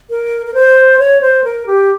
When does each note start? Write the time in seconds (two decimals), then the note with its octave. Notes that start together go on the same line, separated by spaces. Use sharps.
0.10 A#4
0.47 A#4
0.54 C5
0.99 C#5
1.21 C5
1.44 A#4
1.66 G4